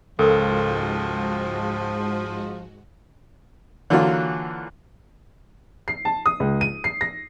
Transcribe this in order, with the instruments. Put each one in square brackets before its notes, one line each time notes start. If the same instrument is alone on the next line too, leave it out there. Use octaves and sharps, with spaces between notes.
[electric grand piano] C#2 [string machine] G#2 G#3 F#4 [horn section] F3 [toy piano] A4 A#4
[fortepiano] D3 E3 F#3 A#3 F4 F#4
[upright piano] C7
A5
D#6
C#2
D#7
C7
A#6